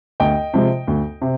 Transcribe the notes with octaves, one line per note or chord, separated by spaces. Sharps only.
D2 D#5 G5
C3 F3 G#3
D2
C3